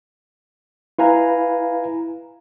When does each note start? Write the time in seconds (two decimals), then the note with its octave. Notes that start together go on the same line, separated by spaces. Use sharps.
0.99 E4 B4 F5 G#5 A#5